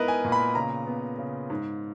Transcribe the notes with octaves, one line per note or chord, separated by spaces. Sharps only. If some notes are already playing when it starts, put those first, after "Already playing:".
Already playing: G#2 B3 E4 A#4 B4 D#5
G#5
A#2
B5
C#3 A#5
B3
C#3
G#2